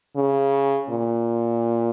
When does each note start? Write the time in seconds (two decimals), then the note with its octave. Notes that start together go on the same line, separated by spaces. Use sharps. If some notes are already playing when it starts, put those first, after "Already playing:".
0.16 C#3
0.90 A#2